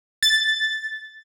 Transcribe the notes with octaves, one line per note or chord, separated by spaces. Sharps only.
A6